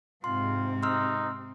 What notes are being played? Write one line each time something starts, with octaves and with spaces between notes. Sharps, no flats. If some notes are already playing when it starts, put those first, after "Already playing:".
G#2 C3 C4 F4 C6
D#4 C6 E6 F6